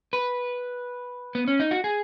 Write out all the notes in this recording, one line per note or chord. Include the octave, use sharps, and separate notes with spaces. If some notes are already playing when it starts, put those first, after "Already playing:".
B4
B3
C#4
D#4
F#4
G#4